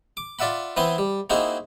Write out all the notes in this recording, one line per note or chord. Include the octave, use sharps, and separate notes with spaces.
D6
F4 D5 E5 F#5 B5
E3 B3 C4 E4 C6
G3
A#3 C4 D#4 E4 F#4 G#4